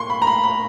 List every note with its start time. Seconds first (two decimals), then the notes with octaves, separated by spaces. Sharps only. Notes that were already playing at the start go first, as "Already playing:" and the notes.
Already playing: A2 A#3 C6 C#6
0.10 B5
0.22 A#5
0.27 B5
0.44 B5